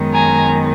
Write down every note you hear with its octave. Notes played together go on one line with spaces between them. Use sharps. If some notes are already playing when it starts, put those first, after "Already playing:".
Already playing: F#2 D#3 G#3 B3
G#5 A#5